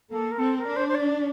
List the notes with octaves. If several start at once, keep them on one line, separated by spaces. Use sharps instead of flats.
A#3 A4
A#4
C4 A4
A#4
D4
C5
C5
D5